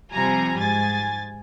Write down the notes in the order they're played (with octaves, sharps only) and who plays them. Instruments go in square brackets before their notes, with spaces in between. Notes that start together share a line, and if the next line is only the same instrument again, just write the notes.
[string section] C3 F3 G3 G#5 A#5
G#2 G#5 A6